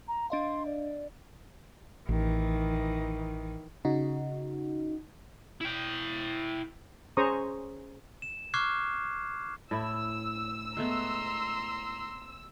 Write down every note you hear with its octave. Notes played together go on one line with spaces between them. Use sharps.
A#5
D4 D#5 F5 C6
D5
A1 D#3 E3
C#3 D#4 F#4
E4 G5
C#4 G#4 C5 A#5 C#6 D#6
E7
C#6 D6 F6 F#6 G#6 C7
A2 E4 E6
G#3 A3 B3 A#5 C6